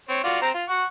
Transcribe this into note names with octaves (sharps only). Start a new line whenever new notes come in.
C4 C#5
F4 F#4 D5
C4 C5 A#5
F4
F#5 C#6